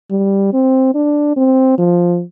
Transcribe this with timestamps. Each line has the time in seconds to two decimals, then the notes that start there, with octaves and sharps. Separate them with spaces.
0.10 G3
0.53 C4
0.94 D4
1.36 C4
1.78 F3